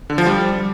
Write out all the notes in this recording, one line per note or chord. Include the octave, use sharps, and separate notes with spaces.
D3
F3
G3